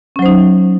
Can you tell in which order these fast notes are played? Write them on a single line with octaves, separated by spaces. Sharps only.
C#4 F#3 C5 D#4